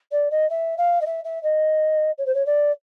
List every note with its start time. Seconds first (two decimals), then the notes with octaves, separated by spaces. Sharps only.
0.12 D5
0.31 D#5
0.50 E5
0.78 F5
1.01 D#5
1.06 E5
1.24 E5
1.43 D#5
2.18 C#5
2.26 C5
2.34 C#5
2.46 D5